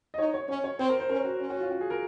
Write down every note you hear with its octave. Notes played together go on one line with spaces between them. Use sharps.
D#5
D#4 C#5
C#5
C#4 C#5
C#5
C4 C5
A#4
C5
C#4 A#4
F#4
C#4
F#4
F4
F#4
G#4
A#4